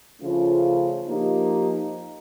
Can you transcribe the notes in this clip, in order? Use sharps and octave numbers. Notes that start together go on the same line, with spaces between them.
C#3 F3 A3 C#4 F4
F3 A#3 D#4 G4